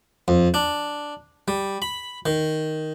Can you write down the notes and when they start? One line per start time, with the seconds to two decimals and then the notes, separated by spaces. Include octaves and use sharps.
0.28 F2
0.54 D4
1.48 G3
1.82 B5
2.26 D#3